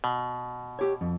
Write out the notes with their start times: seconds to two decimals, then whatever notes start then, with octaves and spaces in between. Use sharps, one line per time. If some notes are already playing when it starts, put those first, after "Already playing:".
0.04 B2
0.79 G4 C#5
1.01 F2